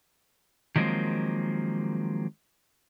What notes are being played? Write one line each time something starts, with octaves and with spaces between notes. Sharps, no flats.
D#3 F3 F#3 G#3 A#3 C4